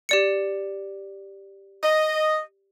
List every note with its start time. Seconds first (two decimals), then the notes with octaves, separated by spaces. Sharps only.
0.09 G4 D5 C#7
1.84 D#5